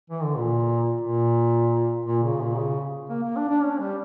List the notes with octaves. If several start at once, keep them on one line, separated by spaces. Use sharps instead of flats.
E3
D3
A#2
A#2
A#2
C#3
A#2
C#3
A#3
A#3
D4
D4
C#4
G3